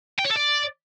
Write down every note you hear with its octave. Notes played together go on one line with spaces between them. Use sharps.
G5
C#5
A4
D5